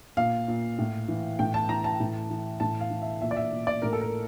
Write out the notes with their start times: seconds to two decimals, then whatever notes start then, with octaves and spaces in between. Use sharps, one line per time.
0.17 A#2 F5
0.48 A#2
0.79 A2
1.08 E3
1.39 A2 G5
1.54 A5
1.69 E3 A#5
1.84 A5
2.00 A2
2.30 E3
2.60 A2 A5
2.81 F5
2.90 E3
3.02 E5
3.21 A#2 E5
3.31 D5
3.36 E5
3.52 A#2
3.67 D5
3.82 A2 A#4
3.93 A4
4.01 A#4